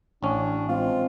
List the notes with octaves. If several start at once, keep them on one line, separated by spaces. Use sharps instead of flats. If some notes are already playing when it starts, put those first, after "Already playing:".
A1 C#4 D4
G#3 C4 F4